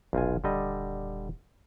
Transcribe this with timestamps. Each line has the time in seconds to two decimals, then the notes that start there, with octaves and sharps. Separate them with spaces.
0.13 F1 B1 F4 G#5
0.44 D#1 D3 G3 D#5